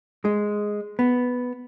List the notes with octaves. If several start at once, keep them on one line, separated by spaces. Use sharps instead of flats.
G#3
B3